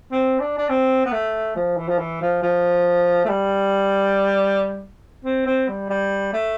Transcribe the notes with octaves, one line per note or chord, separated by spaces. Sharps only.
C4
D4
D4
C4
B3
A3
F3
E3
F3
E3
F3
F3
A3
G3
C4
C4
G3
G3
A3